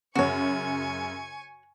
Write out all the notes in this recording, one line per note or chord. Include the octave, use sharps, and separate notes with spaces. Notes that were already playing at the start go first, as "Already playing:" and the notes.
F#2 C#3 F#4 C#5 G#5 C#6